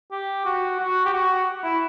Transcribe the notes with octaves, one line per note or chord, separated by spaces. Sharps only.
G4
F#4
F#4
G4
F#4
E4